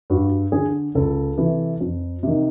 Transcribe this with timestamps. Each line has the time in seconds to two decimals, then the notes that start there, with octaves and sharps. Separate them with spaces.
0.10 G2 F#4
0.52 D3 G#4
0.95 C#2 A4
1.38 C3 E3
1.80 F2
2.23 C3 D#3